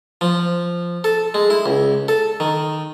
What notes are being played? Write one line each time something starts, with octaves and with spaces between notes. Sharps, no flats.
F3
A4
G#3
E4
C#2
A4
D#3